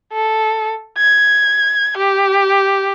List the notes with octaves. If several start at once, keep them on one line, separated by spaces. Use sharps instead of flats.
A4
G#6
G4